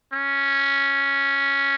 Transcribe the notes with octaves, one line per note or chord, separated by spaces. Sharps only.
C#4